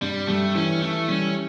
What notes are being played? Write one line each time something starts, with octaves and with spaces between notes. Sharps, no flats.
G2 G3
G3 A3
E3 C#4
E3 A3
G3 C#4